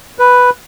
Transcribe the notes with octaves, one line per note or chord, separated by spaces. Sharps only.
B4